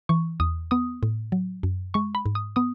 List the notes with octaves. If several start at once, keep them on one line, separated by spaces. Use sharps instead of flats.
E3 C#6
E2 D#6
B3 D#6
A2
F#3
F#2
G#3 C#6
B5
G#2
D#6
B3 D#6